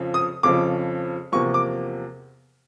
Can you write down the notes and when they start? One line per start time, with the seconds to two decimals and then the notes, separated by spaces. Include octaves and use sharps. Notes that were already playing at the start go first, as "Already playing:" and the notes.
Already playing: F2 C#3 F3
0.14 D#6
0.43 F2 C#3 F3 D6
1.32 E2 C3 F3 A#3 C#6
1.54 D6